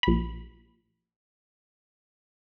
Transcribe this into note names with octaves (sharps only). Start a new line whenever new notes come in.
A#1 B5